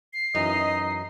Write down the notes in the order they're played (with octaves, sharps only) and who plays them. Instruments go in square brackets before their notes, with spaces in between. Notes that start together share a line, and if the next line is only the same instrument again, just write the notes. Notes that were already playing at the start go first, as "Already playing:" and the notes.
[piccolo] C7
[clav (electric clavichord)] F#2 E3 [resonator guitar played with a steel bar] D#4 [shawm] D#5